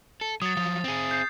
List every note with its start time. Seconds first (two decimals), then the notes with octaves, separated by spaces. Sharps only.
0.21 A4
0.42 F#3 D#6 A6
0.57 F3 F#3 D#6
0.84 C4 G#4
1.11 G6 C7